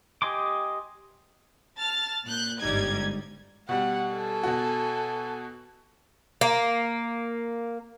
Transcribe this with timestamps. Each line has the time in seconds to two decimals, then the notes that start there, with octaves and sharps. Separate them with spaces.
0.22 G4 D#5 G#5 C6 D6
1.79 A5 F6 A6
2.25 A#2 F#6 G6
2.60 G1 G#2 G3 D#4 G#6
3.69 B2 G3 F#5
4.14 A4 G#5
4.43 B2 F#4
6.41 A#3